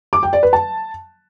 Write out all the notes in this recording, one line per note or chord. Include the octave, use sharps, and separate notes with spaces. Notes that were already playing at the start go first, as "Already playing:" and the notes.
D6
G5
D5
B4
A5